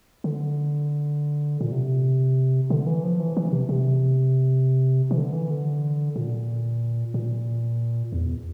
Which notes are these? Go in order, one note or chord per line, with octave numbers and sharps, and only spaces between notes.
D3
A#2
C3
D3
E3
F3
E3
E3
C3
C3
E3
D3
E3
D3
A#2
A#2
E2